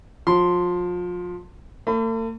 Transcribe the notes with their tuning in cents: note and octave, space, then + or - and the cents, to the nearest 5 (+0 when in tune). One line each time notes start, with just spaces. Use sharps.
F3 +30 C6 +0
A3 +45 B5 +40